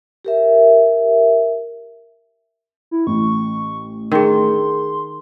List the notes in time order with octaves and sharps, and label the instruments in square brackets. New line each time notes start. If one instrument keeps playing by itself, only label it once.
[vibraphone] G4 A#4 E5
[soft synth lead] E4
[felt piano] A1 [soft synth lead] C#6
[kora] D#3 [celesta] G#4 A#4 [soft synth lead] C6